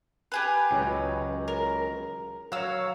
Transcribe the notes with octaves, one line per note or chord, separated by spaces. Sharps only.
G4 G#4 B4
C#2 C#3 F#3
A#4
F#3 C#5 F5 E6